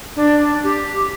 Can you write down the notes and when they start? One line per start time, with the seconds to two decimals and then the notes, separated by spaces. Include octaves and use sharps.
0.16 D4
0.63 G4